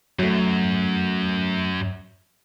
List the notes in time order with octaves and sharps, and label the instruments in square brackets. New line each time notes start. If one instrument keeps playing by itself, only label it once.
[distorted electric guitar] F#2 [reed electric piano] F#3 A3